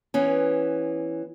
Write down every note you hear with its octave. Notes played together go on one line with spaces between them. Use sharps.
E3 B3 C#4